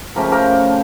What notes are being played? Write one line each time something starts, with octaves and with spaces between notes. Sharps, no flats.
C#3 F3 A3 C#4 G4 A#4
G4 A#4